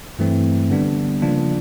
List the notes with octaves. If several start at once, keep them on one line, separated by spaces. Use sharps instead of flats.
G2 E3 A3 C4
D3 G3 B3 D4
C#3 F3 A#3 D4 F4